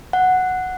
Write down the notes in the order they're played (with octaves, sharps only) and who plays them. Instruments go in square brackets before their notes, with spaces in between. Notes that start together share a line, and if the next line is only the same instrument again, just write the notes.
[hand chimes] F#5